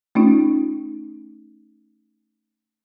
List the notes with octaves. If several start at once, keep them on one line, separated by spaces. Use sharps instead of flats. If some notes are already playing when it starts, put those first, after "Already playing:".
A3 C#4 D#4 F4